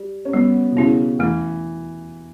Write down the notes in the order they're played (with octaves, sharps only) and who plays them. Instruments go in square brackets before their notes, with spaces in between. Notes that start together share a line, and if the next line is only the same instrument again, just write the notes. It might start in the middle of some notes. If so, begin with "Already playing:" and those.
Already playing: [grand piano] G3
C#4
[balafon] G3 [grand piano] B3
[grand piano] B2
[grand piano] C#3 [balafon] C#4 E4
[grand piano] E3 [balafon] A3